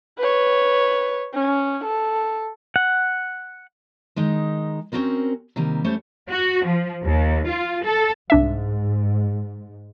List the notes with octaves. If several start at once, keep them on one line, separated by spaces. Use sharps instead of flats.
B4 C#5
C#4
A4
F#5
D#3 G#3 D#4
C4 C#4 D#4 F#4 A#4 C5
C3 D#3 G3 A#3
G3 A3 C#4 C5 C#5
F#4
F3
D#2
F4
A4
C2 G#2 D4 E5